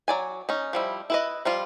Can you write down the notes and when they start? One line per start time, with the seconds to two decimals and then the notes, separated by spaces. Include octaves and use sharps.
0.08 F#3 D5 G#5
0.49 C#4 D#4
0.73 F3 G3 E4
1.10 E4 B4 D#5
1.45 F3 G3 F4